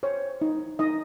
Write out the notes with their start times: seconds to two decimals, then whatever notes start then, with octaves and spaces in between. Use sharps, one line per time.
0.03 C5 C#5
0.42 D#4
0.79 D#4 D#5